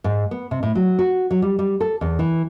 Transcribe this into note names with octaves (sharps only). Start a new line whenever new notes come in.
G#2
B3
C3
A2
F#3
F#4
F#3
G3
G3
A4
E2
E3